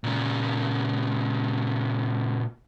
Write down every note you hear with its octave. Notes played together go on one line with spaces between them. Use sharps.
A#2 C#3